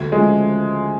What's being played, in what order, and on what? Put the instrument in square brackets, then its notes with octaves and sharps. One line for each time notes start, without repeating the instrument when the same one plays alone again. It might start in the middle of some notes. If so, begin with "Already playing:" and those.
Already playing: [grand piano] D2
[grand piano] C#3 F3 [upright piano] G#3